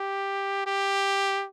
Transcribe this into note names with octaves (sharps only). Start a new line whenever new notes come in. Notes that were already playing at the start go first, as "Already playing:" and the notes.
Already playing: G4
G4